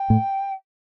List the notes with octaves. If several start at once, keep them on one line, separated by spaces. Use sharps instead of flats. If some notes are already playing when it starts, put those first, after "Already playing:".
Already playing: G5
A2